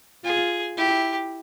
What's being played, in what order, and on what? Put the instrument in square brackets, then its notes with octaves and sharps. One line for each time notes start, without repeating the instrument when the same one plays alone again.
[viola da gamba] F4 [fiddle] G#4
[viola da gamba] E4 [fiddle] G4